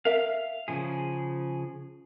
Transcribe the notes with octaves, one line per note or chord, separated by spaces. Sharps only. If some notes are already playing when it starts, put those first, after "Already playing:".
A#4 E5 F5
C#3 F3 G#4